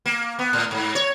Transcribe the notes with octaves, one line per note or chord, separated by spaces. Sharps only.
A#3
B3
A2
G#2
C#5